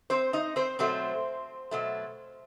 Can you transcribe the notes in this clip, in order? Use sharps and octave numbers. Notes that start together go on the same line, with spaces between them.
C4 C5
D#4 D#5
C4 C5
B2 F#3 A3 C4 C5
B2 F#3 A3